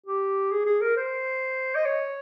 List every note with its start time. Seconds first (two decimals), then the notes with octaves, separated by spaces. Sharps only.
0.06 G4
0.51 G#4
0.66 G#4
0.81 A#4
0.97 C5
1.75 D#5
1.85 C#5